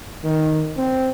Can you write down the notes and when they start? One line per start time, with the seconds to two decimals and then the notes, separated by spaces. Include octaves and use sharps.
0.24 D#3
0.77 C4